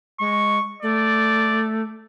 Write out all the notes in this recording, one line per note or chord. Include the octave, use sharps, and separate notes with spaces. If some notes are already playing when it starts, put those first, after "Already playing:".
G#3 C#6
A3 D5